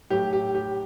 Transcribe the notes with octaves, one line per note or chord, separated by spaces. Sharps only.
A2 F#3 G4
G4
G4